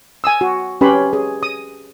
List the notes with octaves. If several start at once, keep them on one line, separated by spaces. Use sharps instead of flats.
G#5 D#6 E6
F#4
C#4 G4 B4 C#5 B5 C6
G#4
D#6